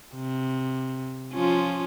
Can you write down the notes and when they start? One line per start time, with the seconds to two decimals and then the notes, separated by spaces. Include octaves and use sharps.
0.15 C3
1.33 F3 C#4 F4